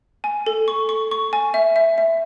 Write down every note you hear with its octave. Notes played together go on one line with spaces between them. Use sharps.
G#5
A4
C#6
C#6
C#6
G#5
E5
E5
E5